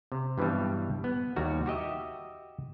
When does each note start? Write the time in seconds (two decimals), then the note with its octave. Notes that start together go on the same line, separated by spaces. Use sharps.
0.12 C3
0.38 G2 B2 E3 F#3 G3
1.04 B3
1.36 D#2 G3 F#4 A#4
1.66 F#4 G4 D#5 E5